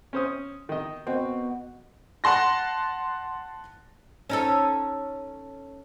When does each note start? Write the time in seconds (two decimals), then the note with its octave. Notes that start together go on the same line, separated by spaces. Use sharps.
0.13 C#4 C5 D#6
0.69 D#3 D#5
1.07 B2 C4
2.24 F#5 A5 C6 A#6
4.30 C#4 D#4 A4